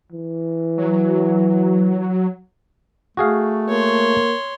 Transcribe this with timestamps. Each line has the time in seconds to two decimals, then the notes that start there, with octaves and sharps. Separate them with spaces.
0.12 E3
0.78 F#3
3.17 A3 F#4 G#4 F5
3.69 A#3 C#5 C6